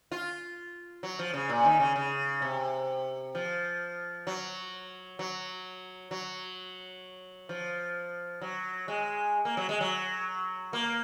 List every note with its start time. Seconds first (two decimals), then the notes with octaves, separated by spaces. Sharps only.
0.11 F4
1.03 F#3
1.19 F3
1.34 C#3
1.49 A#2
1.65 D#3
1.80 C#3
1.96 C#3
2.42 C3
3.35 F3
4.27 F#3
5.19 F#3
6.11 F#3
7.49 F3
8.41 F#3
8.88 G#3
9.45 A#3
9.57 F#3
9.69 G#3
9.81 F#3
10.73 A#3